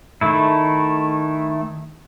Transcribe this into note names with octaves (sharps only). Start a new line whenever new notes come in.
D#3 A3 E4